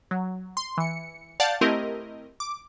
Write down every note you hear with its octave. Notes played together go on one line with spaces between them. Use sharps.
F#3
C6
E3 C#7
D5 F5 F#5 A5 G6 A6
A3 C4 E4 G4 A#4 D#5
D6